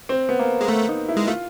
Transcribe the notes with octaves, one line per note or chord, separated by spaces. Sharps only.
C4
B3
A#3
G#3 A#3
A3 B3
D#4
E4
G#3
A3 F4